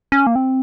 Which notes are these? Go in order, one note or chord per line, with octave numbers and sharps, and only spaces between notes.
C#4
A#3
C4